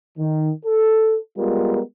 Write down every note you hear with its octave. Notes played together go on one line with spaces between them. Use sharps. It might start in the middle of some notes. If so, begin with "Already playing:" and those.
D#3
A4
G3 G#3 B3 F4 A#4